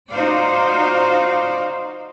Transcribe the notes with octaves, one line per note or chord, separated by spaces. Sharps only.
D#4 F4 F#4 C5 D5 F5